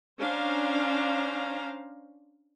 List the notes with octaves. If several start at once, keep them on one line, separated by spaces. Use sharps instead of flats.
C#4 D4 C5 F5 A#5